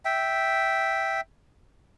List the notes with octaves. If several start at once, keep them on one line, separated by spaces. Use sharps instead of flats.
E5 G5